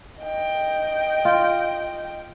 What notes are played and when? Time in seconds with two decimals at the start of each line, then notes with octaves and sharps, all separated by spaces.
0.21 D#5 G5
1.25 F4